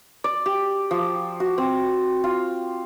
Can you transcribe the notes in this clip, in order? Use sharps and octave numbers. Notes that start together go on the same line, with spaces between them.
D5
G4
F3
F#4
C4
F4